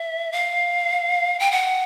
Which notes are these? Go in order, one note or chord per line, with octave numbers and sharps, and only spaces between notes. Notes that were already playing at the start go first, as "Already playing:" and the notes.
Already playing: E5
F5
G5
F#5